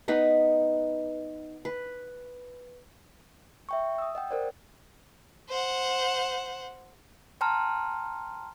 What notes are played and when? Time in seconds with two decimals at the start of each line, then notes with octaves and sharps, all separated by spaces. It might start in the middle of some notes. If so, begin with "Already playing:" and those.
0.08 B3 D#4 B4
1.65 B4
3.69 E5 G5 C#6
3.98 D#6 E6
4.15 D#5 F#5 G5
4.31 A#4 C5 D5
5.49 C5 F#5
7.41 G5 A5 A#5 C6 F6